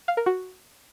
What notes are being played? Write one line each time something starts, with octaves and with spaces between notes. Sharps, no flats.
F5
A#4
F#4